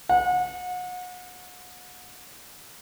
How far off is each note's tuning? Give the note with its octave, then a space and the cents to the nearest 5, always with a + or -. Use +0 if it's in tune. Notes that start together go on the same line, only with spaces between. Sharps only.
F#5 -35